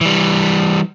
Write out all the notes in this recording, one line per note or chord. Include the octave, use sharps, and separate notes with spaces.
E3 G3